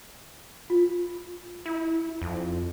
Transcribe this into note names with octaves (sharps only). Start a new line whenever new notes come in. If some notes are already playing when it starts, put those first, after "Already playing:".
F4
E4
F2